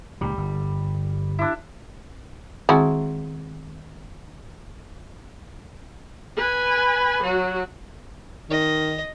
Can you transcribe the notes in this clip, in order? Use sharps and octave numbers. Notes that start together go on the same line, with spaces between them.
C#2 A#2 D#3 G3
G1
D4 E4
D#3 G#3 C4 E4 F#4 A#5
B4 G#5
F#3 F#4
D#3 D#5